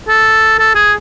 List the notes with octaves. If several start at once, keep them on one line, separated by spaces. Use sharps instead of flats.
A4
A4
G#4